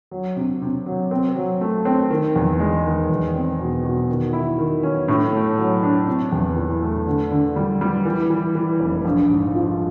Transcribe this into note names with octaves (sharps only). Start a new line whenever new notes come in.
F#3
C3
C3
F#3
C4
F#3
A3
C4
D#3
E2
G#3
D#3
E2
C4
B2
B2
D#3
E4
D#3
C#4
A2
A3
F#3
D4
C3
E2
E3
A3
D3
D3
G3
G3
E3
E3
E3
F1
A#1
G#2
F3